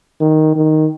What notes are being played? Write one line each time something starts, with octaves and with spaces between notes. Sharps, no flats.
D#3
D#3